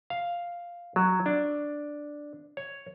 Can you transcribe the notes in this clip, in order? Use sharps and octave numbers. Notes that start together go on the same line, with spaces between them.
F5
F#3
D4
C#5